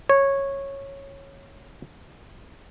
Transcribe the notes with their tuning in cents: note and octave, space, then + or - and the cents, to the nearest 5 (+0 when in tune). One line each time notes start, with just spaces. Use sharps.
C#5 -10